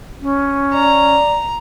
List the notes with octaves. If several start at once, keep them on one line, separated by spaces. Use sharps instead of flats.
C#4
D5 A#5